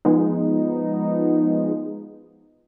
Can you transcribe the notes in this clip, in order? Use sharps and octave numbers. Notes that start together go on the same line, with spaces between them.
F3 G#3 B3 D#4